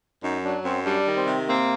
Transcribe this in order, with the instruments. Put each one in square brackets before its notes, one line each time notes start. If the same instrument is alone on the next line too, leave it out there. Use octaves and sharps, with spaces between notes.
[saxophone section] F#2 [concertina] D#4
[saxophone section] F#3 [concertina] D4
[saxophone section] F#2 [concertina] C4
[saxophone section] G3 [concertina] D4
[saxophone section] D#3
[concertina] C4
[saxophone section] C3
[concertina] A#3 [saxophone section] C4